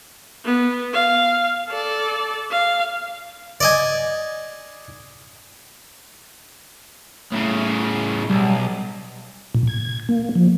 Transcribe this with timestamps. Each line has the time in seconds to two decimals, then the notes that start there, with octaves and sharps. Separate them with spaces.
0.45 B3
0.94 F5
1.69 A4 D5
2.51 F5
3.61 D5 D#5 G#5
7.32 A2 C#3
8.30 B1 G3
9.55 A#2
9.67 G#6
10.09 A#3
10.35 F3